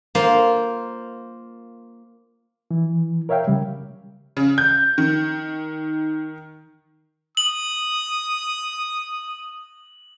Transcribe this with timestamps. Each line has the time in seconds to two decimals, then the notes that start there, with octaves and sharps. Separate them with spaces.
0.15 A#3 F4 C5
2.71 E3
3.29 A#4 C#5 E5 F5 G5
3.48 C#3 G3
4.37 C#3
4.58 G6
4.98 D#3
7.37 D#6 F#7